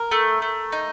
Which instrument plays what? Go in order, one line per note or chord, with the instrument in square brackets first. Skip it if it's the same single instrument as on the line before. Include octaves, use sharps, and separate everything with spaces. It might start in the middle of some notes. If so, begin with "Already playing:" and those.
Already playing: [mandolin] A#4
A3
A3
D#4